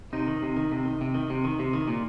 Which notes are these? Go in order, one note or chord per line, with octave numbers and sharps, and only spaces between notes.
C3 D#4
D#3
C3
D#3
C3
D#3
C3
D#3
C3
D#3
C3
D#3
A#2